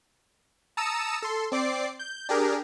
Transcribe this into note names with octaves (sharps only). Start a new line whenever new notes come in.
A5 A#5 D#6 E6 C#7 E7
A4 C6
C4 D5 D6 C7
G6
D4 G4 G#4 A#4